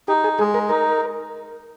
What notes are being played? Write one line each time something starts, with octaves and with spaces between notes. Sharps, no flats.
D#4 G4
G#4
G#3 G#4
A#4
D#4 A#4